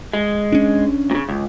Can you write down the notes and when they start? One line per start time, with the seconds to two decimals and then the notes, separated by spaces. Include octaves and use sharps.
0.13 G#3
0.52 C#4 D4
1.11 A#2 C#3
1.29 C#2